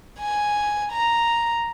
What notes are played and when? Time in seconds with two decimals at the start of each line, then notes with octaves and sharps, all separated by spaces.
0.19 G#5
0.92 A#5